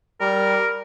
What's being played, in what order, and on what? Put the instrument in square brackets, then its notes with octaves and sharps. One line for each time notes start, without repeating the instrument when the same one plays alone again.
[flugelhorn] G3 [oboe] A#4